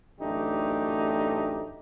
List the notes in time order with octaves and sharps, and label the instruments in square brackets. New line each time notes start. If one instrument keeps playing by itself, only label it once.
[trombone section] A1 F#2 A3 D4 D#4 G4